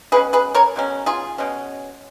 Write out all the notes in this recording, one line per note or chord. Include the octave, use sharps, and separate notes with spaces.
B2 G#3 C#4 G#4 B4
G#4 B4
A#4 C#5
B2 G#3 C#4
F4 G#4
B2 G#3 C#4